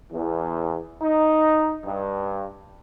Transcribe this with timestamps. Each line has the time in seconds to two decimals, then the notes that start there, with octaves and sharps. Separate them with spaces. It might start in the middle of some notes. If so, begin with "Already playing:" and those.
0.13 E2
1.02 D#4
1.85 G2